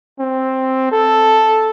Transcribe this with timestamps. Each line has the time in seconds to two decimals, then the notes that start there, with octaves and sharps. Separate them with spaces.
0.19 C4
0.91 A4